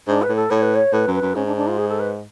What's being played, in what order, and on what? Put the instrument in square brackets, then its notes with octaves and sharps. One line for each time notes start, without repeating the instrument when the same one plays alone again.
[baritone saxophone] G#2 [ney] D4
[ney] B4
[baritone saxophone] A2
[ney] A4
[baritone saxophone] A2 [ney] C#5
[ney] B4
C#5
[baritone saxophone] A2 [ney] B4
[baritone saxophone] F#2
[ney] B4
[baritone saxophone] F#2
[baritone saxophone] G#2 [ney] C#4
[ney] D4
D4
F4
G#4
A4
B4